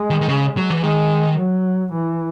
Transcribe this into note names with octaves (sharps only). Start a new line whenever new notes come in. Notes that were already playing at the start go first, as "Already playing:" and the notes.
Already playing: G#3
D#3
D#3
C#3
F#3
E3
D#3 G#3
F#3
E3